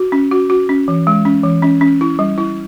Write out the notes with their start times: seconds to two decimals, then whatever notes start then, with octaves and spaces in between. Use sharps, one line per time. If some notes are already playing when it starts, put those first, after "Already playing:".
Already playing: F#4
0.12 C#4
0.32 F#4
0.50 F#4
0.69 C#4
0.88 E3
1.07 G#3
1.25 C#4
1.44 E3
1.62 C#4
1.81 C#4
2.01 E4
2.19 G3
2.38 E4